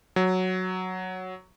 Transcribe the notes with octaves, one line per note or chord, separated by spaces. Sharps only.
F#3